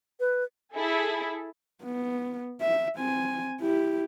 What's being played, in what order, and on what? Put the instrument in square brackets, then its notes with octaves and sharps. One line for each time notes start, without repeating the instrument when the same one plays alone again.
[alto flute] B4
[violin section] E4 G#4 A4
[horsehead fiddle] B3
E5
C4 G#5
E4 G4